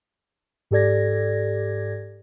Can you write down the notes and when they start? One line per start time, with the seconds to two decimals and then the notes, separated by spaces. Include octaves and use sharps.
0.71 G#2 G4 A4 D5 G#6 A#6